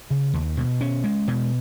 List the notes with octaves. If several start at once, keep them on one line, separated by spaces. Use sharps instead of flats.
C#3
D#2
B2
C#4
G#3
B2